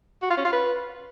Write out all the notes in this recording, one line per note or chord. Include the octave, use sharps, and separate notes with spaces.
F#4
F4
C#4
F4
B4